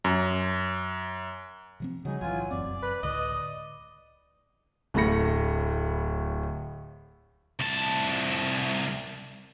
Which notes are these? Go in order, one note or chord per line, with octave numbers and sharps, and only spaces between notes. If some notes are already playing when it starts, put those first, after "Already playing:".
F#2
C3 F3 C4
C#3 F#3 G3 D#4 G#4
B1 A2 E3 F4 G#5
F1 F#2 C4 D5
B4
C#2 A2 D3 D#5
D1 A2 A3 B5 A#6 C#7
C2 A5